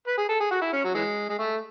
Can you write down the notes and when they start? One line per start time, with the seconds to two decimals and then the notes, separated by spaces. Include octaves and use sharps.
0.08 B4
0.18 G#4
0.29 A4
0.40 G#4
0.51 F#4
0.62 E4
0.73 C#4
0.85 F#3
0.94 E3 G#3
1.29 G#3
1.39 A3